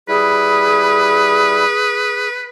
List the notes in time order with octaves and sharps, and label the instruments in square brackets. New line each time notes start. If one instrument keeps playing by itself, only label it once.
[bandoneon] G3 E4 [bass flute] G#4 [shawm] B4